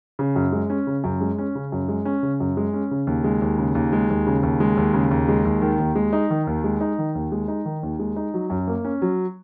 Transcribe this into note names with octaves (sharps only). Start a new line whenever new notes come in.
C#3
F#2
G#3
C#4
C#3
F#2
G#3
C#4
C#3
F#2
G#3
C#4
C#3
F#2
G#3
C#4
C#3
D#2
G#3
D#2
C#3
D#2
G#3
D#2
C#3
D#2
G#3
D#2
C#3
D#2
G#3
D#2
D#3
D#2
G#3
D#4
D#3
D#2
G#3
D#4
D#3
D#2
G#3
D#4
D#3
D#2
G#3
D#4
F#3
F#2
A#3
C#4
F#3